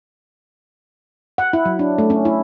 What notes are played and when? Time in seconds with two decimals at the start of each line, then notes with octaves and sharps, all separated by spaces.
1.38 F#5
1.53 E4
1.66 F#3
1.79 D4
1.98 A3
2.10 C#4
2.25 E4